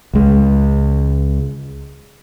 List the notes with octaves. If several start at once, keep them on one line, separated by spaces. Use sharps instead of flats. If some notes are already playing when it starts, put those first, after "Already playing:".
C#2 G#3